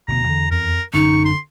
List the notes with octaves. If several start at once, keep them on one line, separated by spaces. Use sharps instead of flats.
F1 D2 B2 B3 A#5
E2 D3
F2 A#4
A1 F#2 D3 C#4 D#4 C#6
C6